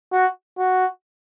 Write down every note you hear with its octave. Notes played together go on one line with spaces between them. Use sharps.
F#4
F#4